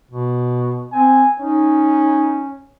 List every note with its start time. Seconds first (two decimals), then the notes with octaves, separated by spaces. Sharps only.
0.11 B2
0.92 C4 G#5
1.40 C#4 D#4